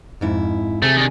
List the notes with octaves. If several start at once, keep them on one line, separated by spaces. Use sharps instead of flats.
F2 G#2 E4
C3 A3 G#4
D#3 D4